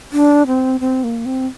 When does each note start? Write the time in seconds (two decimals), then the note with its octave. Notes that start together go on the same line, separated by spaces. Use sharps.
0.12 D4
0.47 C4
0.80 C4
1.04 A#3
1.25 C4